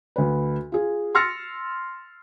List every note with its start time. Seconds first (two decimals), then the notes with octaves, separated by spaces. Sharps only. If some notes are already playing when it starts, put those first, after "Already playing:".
0.16 D2 B4
0.72 F4 G#4
1.15 C6 E6 F6 A6 A#6 C#7